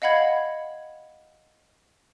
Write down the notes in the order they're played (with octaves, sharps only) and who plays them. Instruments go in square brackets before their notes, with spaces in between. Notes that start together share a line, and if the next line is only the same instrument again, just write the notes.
[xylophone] D#5 F5 F#5 B5 G#6